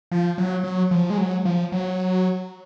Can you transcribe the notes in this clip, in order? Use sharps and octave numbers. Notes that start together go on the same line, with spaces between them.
F3
F#3
F#3
F3
G#3
F#3
F3
F#3